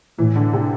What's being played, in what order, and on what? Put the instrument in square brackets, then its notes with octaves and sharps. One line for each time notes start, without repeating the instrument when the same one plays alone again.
[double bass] A2 [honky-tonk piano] E3
[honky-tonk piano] D3
C3